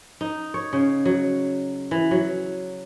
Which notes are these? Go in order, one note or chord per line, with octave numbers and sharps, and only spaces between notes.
D#4
C#5
C#3
F#3
E3
F#3